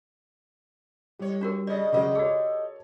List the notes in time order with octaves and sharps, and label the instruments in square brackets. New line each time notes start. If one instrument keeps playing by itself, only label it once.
[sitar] A2 C#5 [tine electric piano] G3 G4
[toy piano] D4 F#4 A#4
[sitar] C#3 D#5 [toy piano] D5
[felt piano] C#3 F#3 G#3 [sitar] G4 D#5 [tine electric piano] A#4
[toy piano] F#4 G#4 [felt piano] A4 C#5